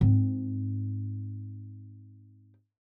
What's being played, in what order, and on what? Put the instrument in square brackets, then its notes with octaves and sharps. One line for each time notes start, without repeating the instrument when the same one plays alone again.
[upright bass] G#2 C4